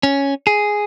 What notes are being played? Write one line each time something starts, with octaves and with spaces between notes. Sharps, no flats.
C#4
G#4